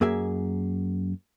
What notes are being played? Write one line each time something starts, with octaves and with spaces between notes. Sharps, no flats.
F#2 A#3 G#4 E5 G#5